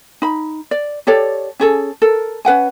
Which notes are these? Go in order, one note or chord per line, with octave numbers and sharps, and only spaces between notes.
D#4 B5
D5
G4 A4 C#5 D5
C#4 G#4 A4
A4 A#4
C#4 B4 F#5 G#5